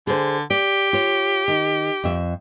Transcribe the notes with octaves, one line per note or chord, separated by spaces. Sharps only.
D3 G#4 C5
G4 D5
F4 C#5
D#3
F2 E5